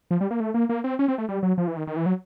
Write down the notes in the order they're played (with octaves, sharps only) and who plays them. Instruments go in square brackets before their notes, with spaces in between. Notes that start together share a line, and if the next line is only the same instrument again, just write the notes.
[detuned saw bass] F3
G3
A#3
A3
A#3
A#3
C4
C#4
C4
A3
G3
F#3
F3
E3
D#3
D#3
E3
F#3